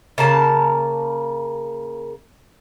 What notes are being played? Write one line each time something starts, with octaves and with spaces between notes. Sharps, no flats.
C#3 A#3 A5